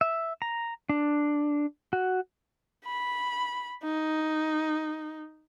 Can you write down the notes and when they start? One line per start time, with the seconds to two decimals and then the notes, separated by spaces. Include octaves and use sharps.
0.01 E5
0.42 A#5
0.89 D4
1.93 F#4
2.85 B5
3.83 D#4